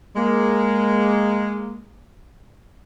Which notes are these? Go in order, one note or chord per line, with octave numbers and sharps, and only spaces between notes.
G#3 A#3